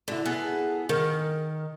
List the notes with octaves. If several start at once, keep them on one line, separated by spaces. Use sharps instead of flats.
D3 E4 F#4 A5
B3 G#4 A4
D#3 A#4